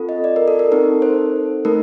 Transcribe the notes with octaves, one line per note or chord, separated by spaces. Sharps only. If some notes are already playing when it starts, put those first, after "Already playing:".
Already playing: C4 F4 A4
D#5
D5
A#4
A4
A#4
C4 D#4 A4 A#4
C5
A3 D#4 A4 A#4